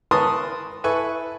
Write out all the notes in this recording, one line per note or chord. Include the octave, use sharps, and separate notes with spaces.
A#4 B4 A5 C6 C#6 D#6
E4 A4 B4 G#5 C#6